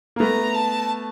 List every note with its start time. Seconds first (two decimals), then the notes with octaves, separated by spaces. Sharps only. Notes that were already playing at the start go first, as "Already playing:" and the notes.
0.16 A#3
0.20 A3 B3 A#5
0.54 A5